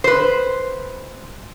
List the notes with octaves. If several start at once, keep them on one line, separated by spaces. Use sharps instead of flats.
B4 C5